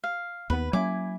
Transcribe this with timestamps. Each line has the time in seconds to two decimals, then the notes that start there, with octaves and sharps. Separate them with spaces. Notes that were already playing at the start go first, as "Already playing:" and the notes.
0.04 F5
0.50 D#2 B3 B4
0.73 F#3 A#3 C#4 E4 G#5 D6